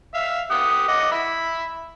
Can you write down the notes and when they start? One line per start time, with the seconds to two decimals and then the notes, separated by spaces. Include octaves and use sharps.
0.14 E5 F5
0.51 G4 F#5 D#6
0.88 D#5 F#5 D6
1.12 E5 B5